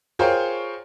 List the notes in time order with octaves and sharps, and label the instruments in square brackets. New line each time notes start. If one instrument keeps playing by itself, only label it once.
[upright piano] F4 G#4 A#4 C5 C#5 G5